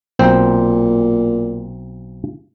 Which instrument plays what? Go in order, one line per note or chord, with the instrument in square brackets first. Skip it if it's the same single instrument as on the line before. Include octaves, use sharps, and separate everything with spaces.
[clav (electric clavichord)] B1 C4 C5 [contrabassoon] A#2